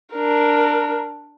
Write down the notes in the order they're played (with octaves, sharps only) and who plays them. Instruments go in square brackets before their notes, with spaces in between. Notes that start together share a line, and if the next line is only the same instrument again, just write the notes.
[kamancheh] D4 A#4